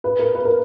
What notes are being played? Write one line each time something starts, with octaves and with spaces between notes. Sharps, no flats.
B4
A#4
B4
A#4